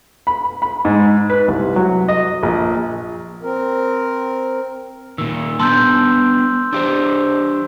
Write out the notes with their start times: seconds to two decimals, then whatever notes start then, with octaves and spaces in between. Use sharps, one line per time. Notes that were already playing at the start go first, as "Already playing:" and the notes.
0.27 B5
0.62 B5
0.85 G#2
1.30 B4
1.48 C2
1.76 F#3
2.08 D#5
2.43 A#1
3.43 C4 A#4
5.18 A#2 D#3 E6
5.60 B3 D4 A5 C6 E6 G6
6.73 D4 G4 C5 E6